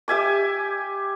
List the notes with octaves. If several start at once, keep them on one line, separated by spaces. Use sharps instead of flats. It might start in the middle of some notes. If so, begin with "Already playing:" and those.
G4 E5 G#5 D6